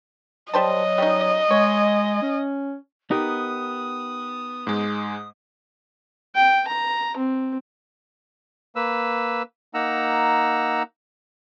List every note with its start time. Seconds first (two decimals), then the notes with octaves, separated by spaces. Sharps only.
0.54 F#3 G3 C5 D#5 A5
0.98 G3 C#4 D#4
1.51 G#3 C#5
2.22 C#4
3.11 B3 D#4 G4 A#4 D#6
4.67 G#2 G#3
6.35 G5
6.68 A#5
7.17 C4
8.76 A#3 B4 E6
9.74 A#3 D#4 F#5 A#5 E6